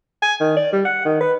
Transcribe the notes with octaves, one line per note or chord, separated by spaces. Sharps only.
G#5
D#3
D5
G3
F#5
D#3
B4